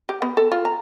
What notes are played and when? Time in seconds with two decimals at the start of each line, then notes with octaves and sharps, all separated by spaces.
0.09 G4
0.22 B3
0.37 A4
0.52 F4
0.65 A#5